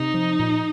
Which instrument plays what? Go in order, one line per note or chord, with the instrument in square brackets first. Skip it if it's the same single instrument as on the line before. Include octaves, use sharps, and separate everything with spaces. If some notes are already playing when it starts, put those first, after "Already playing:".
Already playing: [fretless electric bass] C3 [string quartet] D#4
[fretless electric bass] F3
A#2